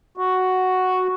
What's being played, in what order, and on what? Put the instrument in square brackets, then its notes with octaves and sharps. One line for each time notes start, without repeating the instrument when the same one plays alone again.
[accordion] F#4